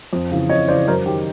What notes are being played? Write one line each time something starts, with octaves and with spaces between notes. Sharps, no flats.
F2
C#3 E3
F2 C#5 D#5
C#3 E3 C5 D5
F#2 A#4 C5
D#3 G4